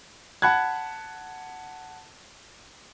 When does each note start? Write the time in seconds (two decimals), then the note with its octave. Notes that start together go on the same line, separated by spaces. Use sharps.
0.42 F#5 A5 B5 F#6 G#6